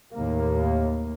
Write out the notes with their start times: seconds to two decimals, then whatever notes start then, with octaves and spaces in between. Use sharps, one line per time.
0.14 D#2 A2 A#3